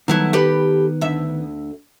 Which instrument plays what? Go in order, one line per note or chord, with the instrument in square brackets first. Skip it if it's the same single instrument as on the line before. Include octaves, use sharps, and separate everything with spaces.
[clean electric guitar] D#3 B3 [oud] F#3 A3 E4
[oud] G4 A4 B4
D2 E5